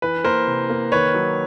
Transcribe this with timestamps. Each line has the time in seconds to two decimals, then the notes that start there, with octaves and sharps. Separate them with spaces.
0.02 E3 B4
0.24 A#3 A#4 C5
0.47 C3
0.70 A#3
0.92 D#3 B4 C#5
1.14 F#3